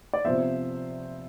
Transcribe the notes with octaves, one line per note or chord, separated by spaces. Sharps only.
D5
C3 F3 B3 C5 E5